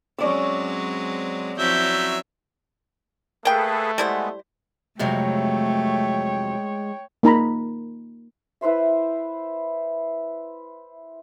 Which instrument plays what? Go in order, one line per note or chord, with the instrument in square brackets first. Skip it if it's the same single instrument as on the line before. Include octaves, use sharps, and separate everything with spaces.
[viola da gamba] F#3 G#3 C4 [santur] C#4 D5 E6
[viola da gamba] F3 C4 E4 [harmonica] F#3 E5 [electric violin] G6 B6
[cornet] A3 [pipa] A#3 G5 [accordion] G#4 A4 B4
[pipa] G3 E4 C5 [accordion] G#3 B3
[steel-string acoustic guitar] F2 C3 F#3 [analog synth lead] G#3 [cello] A3 [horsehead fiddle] C#5 G5
[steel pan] A#3 D#4 A#5 B5
[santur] E4 B4 C5 E5